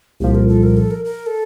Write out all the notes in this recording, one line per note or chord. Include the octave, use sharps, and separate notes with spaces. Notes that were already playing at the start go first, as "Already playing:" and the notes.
C2 A#2 F3 G4
A#4
A4
A#4
A4
A#4
A#4
A4